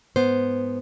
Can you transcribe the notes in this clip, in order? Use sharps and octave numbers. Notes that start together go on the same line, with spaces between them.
G#2 B3 C5